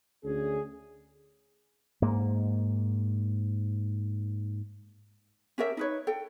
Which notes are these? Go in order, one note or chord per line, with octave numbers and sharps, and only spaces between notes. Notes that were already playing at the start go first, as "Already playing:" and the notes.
D2 C#4 G#4
G#2 A#3
C#4 G4 A#4 E5
D#4 B4 C#5
A4 G5